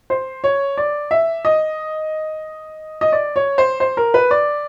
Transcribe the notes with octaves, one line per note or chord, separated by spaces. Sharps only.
C5
C#5
D5
E5
D#5
D#5
D5
C#5
C5
C5
A#4
B4
D5